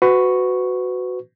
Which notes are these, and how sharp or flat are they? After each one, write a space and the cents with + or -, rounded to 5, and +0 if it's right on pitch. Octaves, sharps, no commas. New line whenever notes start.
F#4 +0 B4 +25 C#6 +0